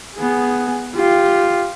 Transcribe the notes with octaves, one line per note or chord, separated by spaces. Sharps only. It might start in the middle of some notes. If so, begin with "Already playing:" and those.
B3 G#4
F4 G4